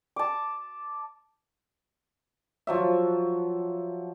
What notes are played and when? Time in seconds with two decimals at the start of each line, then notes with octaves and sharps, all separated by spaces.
0.16 A5 D6
2.67 F3 F#3 E5